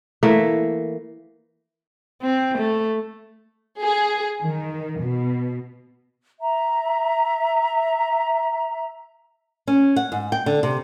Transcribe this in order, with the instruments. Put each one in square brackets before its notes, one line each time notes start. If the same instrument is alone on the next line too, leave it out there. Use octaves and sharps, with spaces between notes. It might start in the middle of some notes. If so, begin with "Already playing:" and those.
[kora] E3 A3 A#3
[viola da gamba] C4
A3
[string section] G#4
D#3
B2
[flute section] E5 A#5
[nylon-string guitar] C#4
F#5
G#2
G5
D3
C3